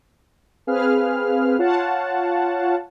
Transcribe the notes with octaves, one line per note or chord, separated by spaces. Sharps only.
C4 G#4 B4 F5 F6
F4 C#5 F5 F#5 A5